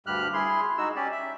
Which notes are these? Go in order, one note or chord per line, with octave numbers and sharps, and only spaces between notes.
D2 G2 G3 G4 F6 F#6
E4 G#4 C6
G#3 D#4 F#4 E6
C#4 G4 D5
E5